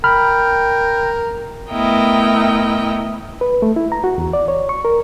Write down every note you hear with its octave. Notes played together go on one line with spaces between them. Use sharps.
A#4 G5 B5 F6
A3 B3 E4 A#4 D#5 G5
B4
A3
E4
A#5
F#4
E2
D5
C#5
C#6
A#4